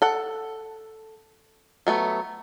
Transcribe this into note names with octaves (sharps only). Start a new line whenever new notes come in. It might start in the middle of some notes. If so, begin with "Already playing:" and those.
A4 F#5
F#3 A3 B3